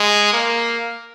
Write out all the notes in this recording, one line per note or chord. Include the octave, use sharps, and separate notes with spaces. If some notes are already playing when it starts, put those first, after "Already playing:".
Already playing: G#3
A#3